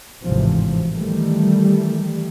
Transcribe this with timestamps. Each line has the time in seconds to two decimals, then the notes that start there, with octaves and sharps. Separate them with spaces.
0.23 G#1 D2 A2 C3 E3 F3
0.93 D#3 E3 G3 A3